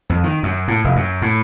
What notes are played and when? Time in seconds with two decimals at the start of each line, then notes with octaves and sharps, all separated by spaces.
0.10 F2
0.23 D#3
0.43 F#2
0.68 A2
0.84 F1
0.96 F#2
1.22 A2